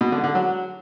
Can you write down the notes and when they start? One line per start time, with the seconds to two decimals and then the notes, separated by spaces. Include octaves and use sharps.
0.01 B2
0.12 D3
0.24 D3
0.35 F#3